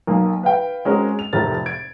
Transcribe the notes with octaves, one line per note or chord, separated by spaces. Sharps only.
B1 A#3
B4 F5 G5
G#3 C4 C#4 F#4 G#4 A#4
F7
F1 F2 A2 C3 A#4 A6
G#6 D7